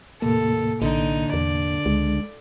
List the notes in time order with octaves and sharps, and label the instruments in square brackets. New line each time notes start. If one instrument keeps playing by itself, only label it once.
[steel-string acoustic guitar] D#2 [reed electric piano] A2 C3 A#3 [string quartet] A4
[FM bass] A#1 [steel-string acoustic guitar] D3 [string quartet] D#4
[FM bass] E2 [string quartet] D5
[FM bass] C#2 [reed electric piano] G#3